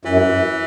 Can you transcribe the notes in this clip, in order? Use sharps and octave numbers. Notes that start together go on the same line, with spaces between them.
F#2 E3